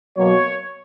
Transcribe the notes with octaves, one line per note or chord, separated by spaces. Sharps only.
B2 F#3 A#3 C#5